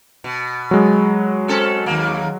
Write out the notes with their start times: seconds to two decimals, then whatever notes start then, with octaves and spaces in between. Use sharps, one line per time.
0.24 B2
0.71 F#3 G#3
1.48 C4 C#4 A4
1.86 D#2 A#3